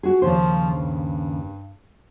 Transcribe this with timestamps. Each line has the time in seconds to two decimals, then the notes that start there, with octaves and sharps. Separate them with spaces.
0.03 F#4 G#4
0.22 D#2 C#3 F3 C5
0.71 G2